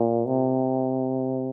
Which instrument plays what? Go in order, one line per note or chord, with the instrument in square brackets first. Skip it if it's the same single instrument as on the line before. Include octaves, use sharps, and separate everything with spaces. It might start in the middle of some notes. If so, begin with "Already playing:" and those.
Already playing: [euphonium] A#2
C3